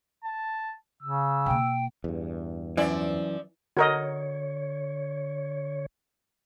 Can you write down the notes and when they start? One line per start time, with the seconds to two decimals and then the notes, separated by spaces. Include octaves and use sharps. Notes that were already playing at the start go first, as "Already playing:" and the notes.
0.24 A5
1.03 C#3 E6
1.46 B2 A#3 G5
2.04 E2 G2
2.77 F#2 E3 F3 D5 E5
3.77 D3 F#4 A#4 C#5 D#5